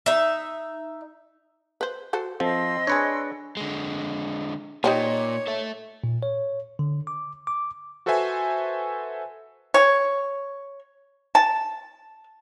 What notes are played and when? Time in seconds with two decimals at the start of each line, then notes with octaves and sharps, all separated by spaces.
0.06 D#4 E5
1.81 B4 C5
2.13 F#4 A4 C5
2.40 F3 C4 A4 D#5 C6 E6
2.87 D4 G#4 B4 C#5 C#7
3.57 D3 G#3
4.84 A#2 D#4 G4 C5 C#5
5.47 A4 E5
6.04 A#2
6.23 C#5
6.79 D3
7.07 D6
7.47 D6
8.06 F#4 A4 B4 C5 E5 G#5
9.74 C#5
11.35 A5